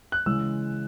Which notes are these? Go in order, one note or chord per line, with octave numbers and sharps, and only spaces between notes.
F#6
C#3 E3 G#3 E6